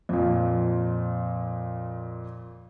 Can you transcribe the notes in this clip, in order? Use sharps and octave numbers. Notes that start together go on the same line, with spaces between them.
F2 A#2